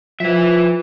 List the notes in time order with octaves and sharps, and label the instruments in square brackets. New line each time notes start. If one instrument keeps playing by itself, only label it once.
[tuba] F3 [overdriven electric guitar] B4 E5